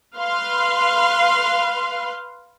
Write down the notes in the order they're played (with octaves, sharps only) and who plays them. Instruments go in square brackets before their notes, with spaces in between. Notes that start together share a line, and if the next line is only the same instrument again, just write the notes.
[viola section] B4 F5 C6